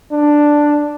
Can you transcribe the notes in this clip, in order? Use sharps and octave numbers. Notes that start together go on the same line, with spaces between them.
D4